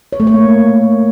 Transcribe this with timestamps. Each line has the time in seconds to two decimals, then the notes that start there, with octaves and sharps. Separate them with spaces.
0.13 C#5
0.20 A3
0.27 C#5
0.34 A#3